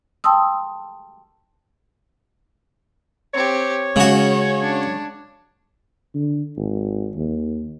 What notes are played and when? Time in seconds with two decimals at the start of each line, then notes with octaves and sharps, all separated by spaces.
0.24 G5 A5 C6 D#6 E6
3.34 C4 G4 C#5
3.96 C#3 G#3 C#4 F#4
4.62 D4
6.15 D3
6.57 G#1
7.17 D#2